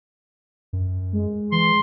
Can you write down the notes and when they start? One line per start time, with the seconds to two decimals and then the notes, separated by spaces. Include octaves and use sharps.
0.73 F#2
1.13 G#3
1.52 E3 C6